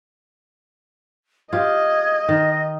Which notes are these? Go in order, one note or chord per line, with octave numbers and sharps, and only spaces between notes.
F4 G4 D#5 G#6
D#3 A#6